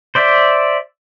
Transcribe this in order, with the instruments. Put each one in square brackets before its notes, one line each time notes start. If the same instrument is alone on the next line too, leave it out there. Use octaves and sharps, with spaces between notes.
[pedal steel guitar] C5 D5 E5